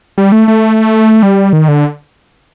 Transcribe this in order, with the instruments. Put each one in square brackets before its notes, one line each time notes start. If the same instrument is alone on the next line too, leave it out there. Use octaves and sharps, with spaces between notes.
[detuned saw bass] G3
A3
A3
G3
D#3
D3